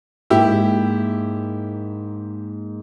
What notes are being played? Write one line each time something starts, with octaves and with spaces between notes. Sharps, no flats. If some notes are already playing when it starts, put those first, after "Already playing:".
G#2 A#3 E4 G4